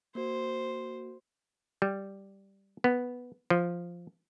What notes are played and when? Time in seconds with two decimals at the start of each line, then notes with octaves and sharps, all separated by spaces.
0.15 A#3 F#4 C5
1.82 G3
2.84 B3
3.50 F3